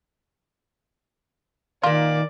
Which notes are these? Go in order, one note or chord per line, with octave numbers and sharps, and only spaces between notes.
A#2 D#3 A#3 F4 D5